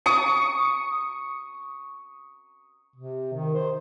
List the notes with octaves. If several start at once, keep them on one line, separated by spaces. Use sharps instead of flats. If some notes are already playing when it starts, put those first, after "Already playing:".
C#6 D#6
C3
D#3
C5